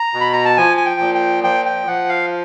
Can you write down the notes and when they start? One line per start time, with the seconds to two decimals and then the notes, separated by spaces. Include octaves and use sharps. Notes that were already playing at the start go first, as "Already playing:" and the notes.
Already playing: A#5
0.13 B2
0.21 B5
0.33 A#5
0.45 A5
0.57 F3 G#5
0.77 G#5
0.86 G5
1.00 A#2
1.15 G5
1.44 F3 G5
1.66 G5
1.87 F3 F#5
2.09 F5